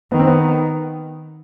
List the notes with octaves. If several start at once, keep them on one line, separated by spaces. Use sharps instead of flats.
D#3 B3
C4
B3